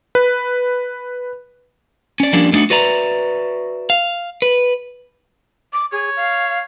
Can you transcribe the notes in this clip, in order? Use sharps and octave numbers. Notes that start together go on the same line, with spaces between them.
B4
C#4 D5
F3 G3 A#3 C#4 D4
D3 A3 D4 D#4 F#4
F#4 B4 D5 E5 A#5
F5
B4
D6
G#4 C#5
F5